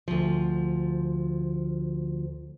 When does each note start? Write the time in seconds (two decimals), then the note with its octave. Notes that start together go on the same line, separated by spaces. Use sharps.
0.08 D2 F3